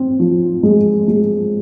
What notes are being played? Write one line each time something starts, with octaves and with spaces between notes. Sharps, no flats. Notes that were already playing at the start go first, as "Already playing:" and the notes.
Already playing: C4
F3
G#3
G#3